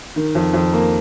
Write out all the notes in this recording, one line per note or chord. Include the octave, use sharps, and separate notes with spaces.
D#3
F2
F2
A#3